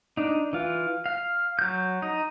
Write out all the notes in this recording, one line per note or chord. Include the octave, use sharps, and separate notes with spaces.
D4 D#4
E3 F4
F5
F#3 G6
D#4